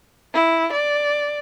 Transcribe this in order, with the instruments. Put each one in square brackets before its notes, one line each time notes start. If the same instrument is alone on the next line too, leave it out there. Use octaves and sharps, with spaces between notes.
[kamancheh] E4
D5